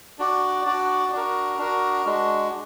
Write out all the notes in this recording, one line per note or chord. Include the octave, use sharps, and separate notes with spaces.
D4 F#4 D5
D4 F#4 D5
D4 F#4 A#4
D4 F#4 A#4
G#3 D4 F#4